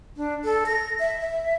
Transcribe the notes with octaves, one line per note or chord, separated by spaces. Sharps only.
D4
A4
A#6
E5
E5